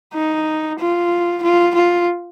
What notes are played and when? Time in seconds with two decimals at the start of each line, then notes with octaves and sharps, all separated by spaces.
0.14 D#4
0.79 F4
1.43 F4
1.75 F4